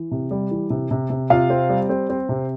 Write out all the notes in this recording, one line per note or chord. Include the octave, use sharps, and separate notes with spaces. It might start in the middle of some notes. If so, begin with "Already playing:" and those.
Already playing: E3
C3
G3
E3
C3
C3
C3
C3 F4 F5
C4
G3
C4
C4
C3